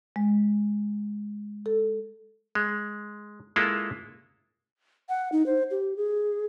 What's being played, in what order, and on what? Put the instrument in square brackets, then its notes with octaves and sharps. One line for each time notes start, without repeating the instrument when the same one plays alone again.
[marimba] G#3
A4
[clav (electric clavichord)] G#3
G#3 A#3 E4 F4 A4
[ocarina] F#5
D#4
C5
G4
G#4